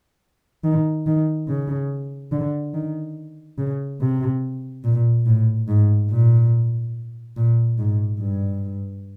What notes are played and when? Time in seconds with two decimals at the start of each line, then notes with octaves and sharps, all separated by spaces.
0.64 D#3
1.07 D#3
1.49 C#3
2.32 D3
2.74 D#3
3.58 C#3
4.01 C3
4.85 A#2
5.26 A2
5.68 G#2
6.11 A#2
7.36 A#2
7.78 G#2
8.20 G2